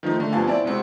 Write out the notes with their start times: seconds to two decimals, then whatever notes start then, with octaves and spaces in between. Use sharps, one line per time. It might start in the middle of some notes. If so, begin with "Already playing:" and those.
0.03 D#3 F3 A3 D#4
0.19 D3 A3
0.32 G2 F3 B3 F5 G#5 A5
0.47 C4 E4 D5
0.64 C2 G#3 C4 F#4